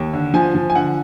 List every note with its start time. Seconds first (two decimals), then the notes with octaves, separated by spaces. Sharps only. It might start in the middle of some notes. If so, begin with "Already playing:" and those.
Already playing: D#2
0.13 D3
0.34 F3 G#5
0.55 F3
0.70 G#5
0.75 D3 F#5